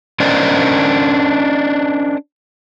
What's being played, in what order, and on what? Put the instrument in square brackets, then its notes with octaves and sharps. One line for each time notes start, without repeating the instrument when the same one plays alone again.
[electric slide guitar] C#4 D4 A#4 C5 D5 D#5